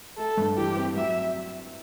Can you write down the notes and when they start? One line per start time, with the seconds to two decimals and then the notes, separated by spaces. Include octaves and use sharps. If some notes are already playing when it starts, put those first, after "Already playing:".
0.18 A3 A4
0.37 G2
0.57 E3 G4
0.77 C4
0.96 F#3 E5